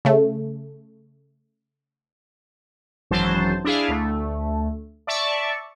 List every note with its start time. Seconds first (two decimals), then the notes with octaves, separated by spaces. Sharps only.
0.05 C#3 A3
3.11 G#1 F#2 E3 F#3 C5 A5
3.64 D4 E4 G#4 F5
3.88 D2 A3
5.07 D5 E5 A5 C#6